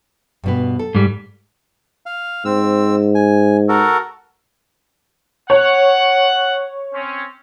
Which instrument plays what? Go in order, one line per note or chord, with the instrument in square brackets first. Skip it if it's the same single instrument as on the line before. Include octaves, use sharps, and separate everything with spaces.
[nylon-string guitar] G2 B2 B3
A4
[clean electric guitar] G#2 G3
[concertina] F5
[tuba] G#2 [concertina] C4 E6
[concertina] G#5
F#4 A4 A#4
[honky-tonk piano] C#5 [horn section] F#5
[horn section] C4 C#4